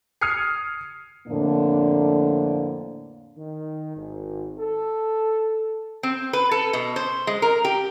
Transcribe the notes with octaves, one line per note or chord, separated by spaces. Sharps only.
D#6 F6 G#6 C7 C#7
F2 A2 D3 F3 A#3 D4
D#3
G#1
A4
C4
B4
A4
B2
C5
G#3
A#4
G4